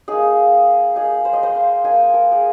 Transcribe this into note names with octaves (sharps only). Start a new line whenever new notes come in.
A#3 D#4 G#4
A#3 D#4 G#4
C5
D#5
C5
F5
A#3 D#4 G#5
A#4
G#4